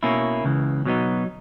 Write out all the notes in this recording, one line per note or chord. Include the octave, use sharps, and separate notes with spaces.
B2 A#3 C#4 E4
C#2 C#3 E3
B2 F#3 B3 D#4